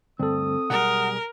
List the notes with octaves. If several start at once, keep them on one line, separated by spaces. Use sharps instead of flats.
D2 G2 C4 A4 D#6
B1 G3 G#4 A#4 F#5